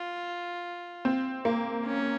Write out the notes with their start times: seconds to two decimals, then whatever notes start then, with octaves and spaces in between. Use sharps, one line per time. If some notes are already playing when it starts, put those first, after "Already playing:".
Already playing: F4
1.05 C4
1.45 A#3
1.86 C#4